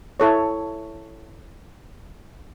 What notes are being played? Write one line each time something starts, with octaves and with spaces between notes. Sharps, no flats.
E4 A4 C#5